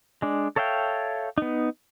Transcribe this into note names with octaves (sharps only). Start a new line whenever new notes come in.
G#3 D4
A4 C#5 E5 F5 G5
B3 D#4